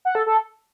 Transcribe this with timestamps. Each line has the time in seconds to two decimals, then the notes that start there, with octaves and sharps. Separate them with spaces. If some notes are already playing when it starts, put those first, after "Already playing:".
0.05 F#5
0.15 A4
0.26 A4